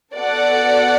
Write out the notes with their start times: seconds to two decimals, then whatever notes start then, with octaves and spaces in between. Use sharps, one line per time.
0.17 B3 F#4 A4 D5 F#5